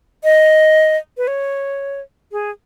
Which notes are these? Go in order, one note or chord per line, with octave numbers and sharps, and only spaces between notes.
D#5
B4
C#5
G#4